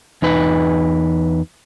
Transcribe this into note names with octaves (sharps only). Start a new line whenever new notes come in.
E2 D#4 B4